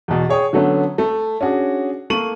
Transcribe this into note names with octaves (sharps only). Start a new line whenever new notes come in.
E2 B2
G#4 C#5 G5 D#6
D3 F#3 A3 B3 C#4
A3
C#4 D4 F#4 G#4
A3 A#3 C#6 D#7 F#7